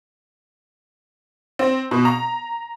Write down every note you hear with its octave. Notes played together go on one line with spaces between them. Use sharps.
C4
B2
A#5